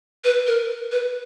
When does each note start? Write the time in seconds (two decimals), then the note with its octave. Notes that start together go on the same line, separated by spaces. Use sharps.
0.24 B4
0.47 A#4
0.92 B4